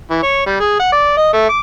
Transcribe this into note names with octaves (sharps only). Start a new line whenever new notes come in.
E3
C#5
G3
G#4
F#5
D5
D#5
A3
D6